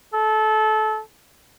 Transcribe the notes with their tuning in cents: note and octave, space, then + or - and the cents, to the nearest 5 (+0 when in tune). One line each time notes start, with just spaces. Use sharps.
A4 -25